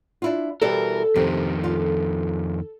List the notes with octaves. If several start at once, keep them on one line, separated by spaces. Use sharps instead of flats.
D4 E4 F4
B2 E3 G3 A4 A#4
F2 C3 D#3
F4